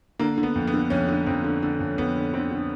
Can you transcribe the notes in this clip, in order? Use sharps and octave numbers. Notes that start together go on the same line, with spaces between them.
D3 A#3
D3
B3
F2
B3
D3
F2 C#4
D3
F2 C4
D3
D3
F2
F2 B3
D3
D3 C4
D3